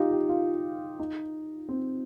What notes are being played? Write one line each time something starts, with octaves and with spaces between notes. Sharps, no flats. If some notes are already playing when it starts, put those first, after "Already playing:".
Already playing: D#4 F4 G4
G4
F4
D#4
C4